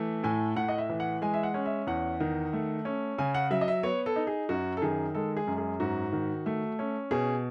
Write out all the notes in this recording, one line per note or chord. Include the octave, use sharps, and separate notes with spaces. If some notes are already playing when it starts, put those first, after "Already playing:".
Already playing: E3 A3
A2 G#5
A2 F#5
D#5
E5
E3
F#5
G#3 G#5
E5
F#5
C#4
E5
E2 F#5
D#3
A3
C#4
C#3 G#5
F#5
F#3 E5
D#5
E5
B3 C#5
A4
D#4
G#4
F#2 F#4
A4
D#3 G#4
G#3 A4
G#4
F#2
G#4
G#2 F#4
D#3
A3
C#4
B2 G#4